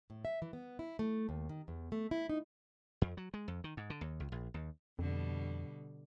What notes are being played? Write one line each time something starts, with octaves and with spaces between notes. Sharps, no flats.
A2
E5
E3
B3
E4
A3
D#2
D#3
E2
A3
E4
D#4
F2
F#3
G#3
F2
D#3
G#2
D3
D#2
C#2
A#1
D#2
F2 B2 D3 G3